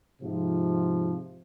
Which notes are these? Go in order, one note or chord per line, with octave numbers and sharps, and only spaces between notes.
G#2 C3 F3